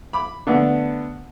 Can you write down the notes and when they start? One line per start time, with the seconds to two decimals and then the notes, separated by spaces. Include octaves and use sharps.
0.13 B5 D6
0.47 D3 A3 B3 D4